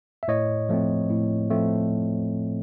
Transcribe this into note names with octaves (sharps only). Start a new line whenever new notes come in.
E5
A2 C#5 D#5
F3 A3 C4
A2
F3 A3 C4